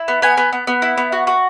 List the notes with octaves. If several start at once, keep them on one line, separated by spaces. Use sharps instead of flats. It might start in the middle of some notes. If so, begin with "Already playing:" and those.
Already playing: E4
B3
B3 G#5
B3
B3
B3
E4
B3
F#4
F#4